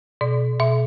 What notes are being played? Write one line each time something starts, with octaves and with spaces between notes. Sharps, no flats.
B2 D5
B2 E5